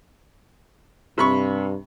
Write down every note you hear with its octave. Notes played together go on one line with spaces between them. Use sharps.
G2 C3 B5 C#6